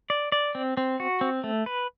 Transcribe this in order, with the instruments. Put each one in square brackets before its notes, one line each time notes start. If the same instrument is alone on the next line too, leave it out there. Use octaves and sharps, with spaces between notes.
[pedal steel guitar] D5
D5
C4
C4
F#4
C4
A3
B4